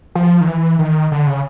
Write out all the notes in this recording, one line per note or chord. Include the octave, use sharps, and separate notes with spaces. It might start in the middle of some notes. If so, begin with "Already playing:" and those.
F3
D#3
E3
D#3
D3
C#3